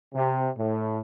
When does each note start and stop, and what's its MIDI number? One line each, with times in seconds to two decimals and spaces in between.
0.14 0.48 48
0.57 0.99 45